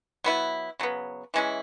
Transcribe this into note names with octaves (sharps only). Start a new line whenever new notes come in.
F#3 B3 E4
C#3 F#3 B3
E3 G#3 C#4 E4